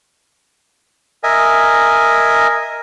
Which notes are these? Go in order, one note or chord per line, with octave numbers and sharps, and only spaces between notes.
A#4 D#5 E5 G#5